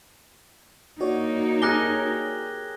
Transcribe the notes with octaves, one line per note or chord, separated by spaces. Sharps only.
A#3 D#4 F#4 C#5 D5
G4 G#4 A#4 F#6 A#6 G7